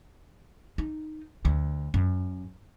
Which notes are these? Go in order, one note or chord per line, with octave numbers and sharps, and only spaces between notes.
D#4
D2
F#2